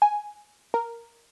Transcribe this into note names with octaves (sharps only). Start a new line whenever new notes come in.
G#5
A#4